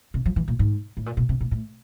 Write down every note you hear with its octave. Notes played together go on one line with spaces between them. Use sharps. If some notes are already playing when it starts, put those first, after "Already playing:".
C3
F3
E3
A#2
G#2
A2
A#2
B2
C3
A#2
A2